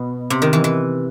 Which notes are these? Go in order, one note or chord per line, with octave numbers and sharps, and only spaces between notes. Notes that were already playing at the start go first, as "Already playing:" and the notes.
Already playing: B2
C3
D#3
E3
E3